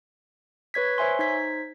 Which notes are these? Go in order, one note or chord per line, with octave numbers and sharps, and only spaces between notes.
B4 C#5 G#6 B6
C5 C#5 E5 G#5 C6
D#4 C5 G#6 B6